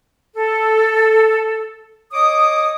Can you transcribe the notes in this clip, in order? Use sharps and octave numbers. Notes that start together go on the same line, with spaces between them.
A4
C#5 D#5 D6 D#6